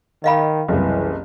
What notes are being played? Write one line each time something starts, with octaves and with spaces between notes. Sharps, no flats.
D#3 D#5 F5 B5
F#1 C2 E3